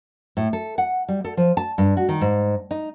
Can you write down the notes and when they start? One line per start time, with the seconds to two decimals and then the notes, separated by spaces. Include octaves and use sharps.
0.37 A2
0.53 A4
0.78 F#5
1.09 G3
1.24 A4
1.37 F3
1.57 A5
1.78 G2
1.97 F#4
2.09 D#3
2.21 G#2
2.71 D#4